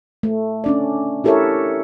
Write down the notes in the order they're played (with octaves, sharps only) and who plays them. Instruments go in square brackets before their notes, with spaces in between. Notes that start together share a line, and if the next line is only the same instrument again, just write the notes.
[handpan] A3
C#4 D4 D5
E4 G4 A4 A#4 C#5 E5